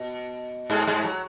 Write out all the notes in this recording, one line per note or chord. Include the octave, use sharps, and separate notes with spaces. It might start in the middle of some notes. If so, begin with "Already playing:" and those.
Already playing: B2
G#2 G#3
G#2 G#3
F#3